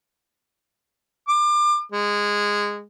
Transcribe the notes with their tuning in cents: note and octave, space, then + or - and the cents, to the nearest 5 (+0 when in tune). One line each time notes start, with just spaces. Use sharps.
D6 +30
G#3 -15